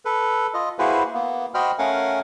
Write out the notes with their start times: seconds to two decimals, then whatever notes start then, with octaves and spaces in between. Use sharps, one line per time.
0.05 A4 B4
0.54 F4 D#5
0.79 A#3 E4 F#4 G#4 B4 C5
1.14 A#3 B3
1.54 F#4 C5 D#5 G5 B5 F6
1.79 A3 C#4 A#4 F5 F#5 G#5